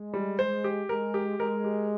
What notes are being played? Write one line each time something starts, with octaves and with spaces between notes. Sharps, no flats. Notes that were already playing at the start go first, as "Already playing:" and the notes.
Already playing: G#3
G3
G#3 C5
G4
G#3 A#4
G4
G#3 A#4
G4